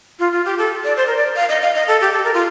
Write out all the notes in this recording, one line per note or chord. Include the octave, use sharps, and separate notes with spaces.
F4
F4
G4
A4
D5
C5
A#4
D5
F5
D#5
F5
D#5
A4
G4
A4
A#4
F4